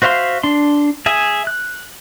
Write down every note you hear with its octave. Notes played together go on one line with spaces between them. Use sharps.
F#4 C5 E5 F5 C6
D4 C6
G#4 E5 G#5
F#6